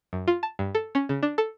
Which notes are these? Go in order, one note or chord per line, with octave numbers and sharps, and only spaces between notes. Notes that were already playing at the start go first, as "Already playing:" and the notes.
F#2
F4
A5
G2
A4
C#4
C#3
D4
A4